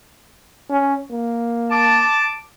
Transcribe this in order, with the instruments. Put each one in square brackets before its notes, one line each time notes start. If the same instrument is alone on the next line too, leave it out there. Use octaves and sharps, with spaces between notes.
[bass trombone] C#4
A#3
[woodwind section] A5 D6